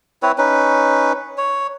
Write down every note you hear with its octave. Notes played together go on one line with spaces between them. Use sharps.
C4 E4 B4 C#5
C#4 D#4 B4
C#5